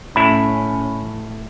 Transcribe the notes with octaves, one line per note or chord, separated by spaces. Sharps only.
A2 C#4 E4 B5